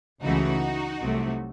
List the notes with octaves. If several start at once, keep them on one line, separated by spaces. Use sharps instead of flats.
C#2 C#3 E3 A3 D#4 F#4
C2 C3 F#3 A3